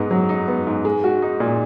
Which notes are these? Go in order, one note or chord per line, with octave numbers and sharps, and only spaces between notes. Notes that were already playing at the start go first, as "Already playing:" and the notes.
Already playing: G#2 B3 D#4
F#3
D#4
B3
G#2
G#3
F#4
D#4
A#2